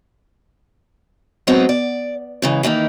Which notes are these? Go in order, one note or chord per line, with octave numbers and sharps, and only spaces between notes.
F#3 G#3 B3 C4 D#4
D5
G#2 C#3 E3
D#3 E3 A#3 D#4